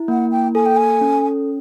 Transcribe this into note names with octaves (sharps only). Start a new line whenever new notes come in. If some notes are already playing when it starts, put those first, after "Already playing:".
Already playing: E4
A#3 F#5
G5
A4 G#5
G5
G#5
C#4